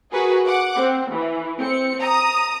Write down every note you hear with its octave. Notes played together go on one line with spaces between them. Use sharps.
F#4 G#4 A#4 B4
F#5 D6
C4
E3
C4 C#7
A#5 D#6